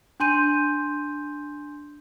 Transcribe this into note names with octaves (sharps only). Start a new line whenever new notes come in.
D4 G#5 C6 G6 D#7